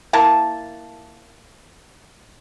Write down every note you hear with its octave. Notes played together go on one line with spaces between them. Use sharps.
A#3 E4 A#4 A5